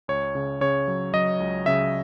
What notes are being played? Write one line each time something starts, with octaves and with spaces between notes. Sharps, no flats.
C#2 C#5
C#3
C#3 C#5
F#3
F#3 D#5
C#2
C#3 E5